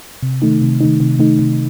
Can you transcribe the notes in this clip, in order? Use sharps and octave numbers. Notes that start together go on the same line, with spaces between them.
C3
D#3 A3 D#4
C3
D#3 A3 D#4
C3
D#3 A3 D#4
C3